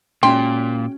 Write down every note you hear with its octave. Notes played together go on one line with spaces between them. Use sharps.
A#2 G#3 C#4 F#4 G5 C6